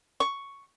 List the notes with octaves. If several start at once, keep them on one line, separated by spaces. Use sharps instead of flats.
C#6